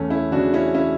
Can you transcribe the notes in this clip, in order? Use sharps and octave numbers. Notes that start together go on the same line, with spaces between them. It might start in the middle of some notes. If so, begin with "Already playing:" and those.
Already playing: E2 A3 C#4
C#4 E4
C#3 E3 D4 F#4
C#4 E4
C#4 E4